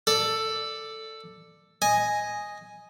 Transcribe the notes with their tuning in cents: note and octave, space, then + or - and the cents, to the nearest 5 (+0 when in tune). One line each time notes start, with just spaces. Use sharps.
A4 +10 D5 +10
D#5 +0 G#5 +0